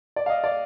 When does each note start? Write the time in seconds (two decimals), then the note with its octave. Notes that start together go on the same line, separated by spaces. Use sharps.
0.16 D5
0.26 F5
0.30 D#5
0.44 D5